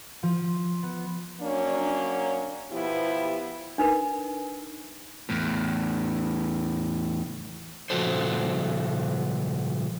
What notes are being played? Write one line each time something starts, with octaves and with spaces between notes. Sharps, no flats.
F3
B3
F#3 A#3 C#4 D4
B2 F3 B3 E4 G4
D4 D#4 A#4 B4
E2 A2
A#2 C#3 F3 F#4 A4 C5